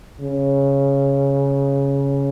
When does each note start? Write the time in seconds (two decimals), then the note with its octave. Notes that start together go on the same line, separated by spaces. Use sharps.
0.21 C#3